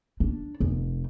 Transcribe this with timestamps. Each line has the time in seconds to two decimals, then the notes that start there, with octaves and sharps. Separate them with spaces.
0.20 D4
0.60 F1